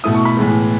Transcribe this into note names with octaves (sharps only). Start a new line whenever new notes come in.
B2 A3 E4 D#6
C#6
B5
A2 E3 G#3 B3